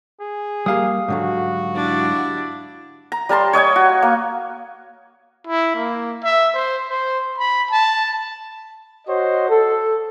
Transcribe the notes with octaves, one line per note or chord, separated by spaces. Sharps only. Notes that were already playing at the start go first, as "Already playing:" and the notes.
G#4
G3 A#3 G4 F5 D#6
G#2 D3 F#3 F#4
D4 E4
A#5
G3 A#4 A5 C6
C#5 D#5 G5 G#5
F#4
A#3
E4
A#3
E5
C5
C5
B5
A5
F#4 C5 C#5 D#5
A4